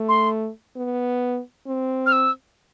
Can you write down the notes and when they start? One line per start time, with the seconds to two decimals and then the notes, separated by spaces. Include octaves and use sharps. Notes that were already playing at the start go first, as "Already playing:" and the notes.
Already playing: A3
0.09 C6
0.76 B3
1.67 C4
2.06 F6
2.12 E6